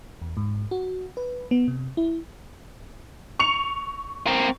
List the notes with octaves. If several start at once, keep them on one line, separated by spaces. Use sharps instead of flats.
E2
G#2
F#4
B4
B3
C3
E4
C#6 C#7 F7
C4 A#4